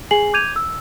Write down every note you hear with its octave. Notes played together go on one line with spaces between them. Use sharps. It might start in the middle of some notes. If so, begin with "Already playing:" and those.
G#4 G#5 C7 F#7
D6 G6 G#6 D#7 F7
E6